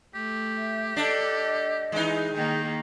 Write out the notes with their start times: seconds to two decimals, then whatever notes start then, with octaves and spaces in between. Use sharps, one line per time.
0.15 A3 G4
0.56 E5
0.97 D4 A4 D#5
1.92 E3 G#3 D#4
2.35 D#3 A#3 G5